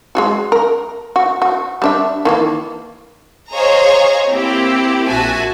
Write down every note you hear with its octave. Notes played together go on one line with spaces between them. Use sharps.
G#3 F4 F#4
A#4
F#4
F#4
G3 D4 E5
D#3 E3 A#3
G#4 C5 C#5 D#5 F5 A#5
A#3 C4 E4 G4
A#1 F#4 E5 G#5 A5